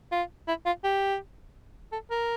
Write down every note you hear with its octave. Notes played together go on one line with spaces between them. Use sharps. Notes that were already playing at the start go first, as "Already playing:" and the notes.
F4
E4
F4
G4
A4
A#4